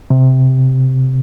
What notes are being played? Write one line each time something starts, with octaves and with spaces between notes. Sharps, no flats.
C3